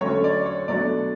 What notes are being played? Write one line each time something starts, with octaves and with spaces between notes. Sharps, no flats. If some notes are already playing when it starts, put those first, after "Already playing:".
D3 F#3 A3 C#4 C#5
D5
C#5
B2 F#3 A3 D4 D5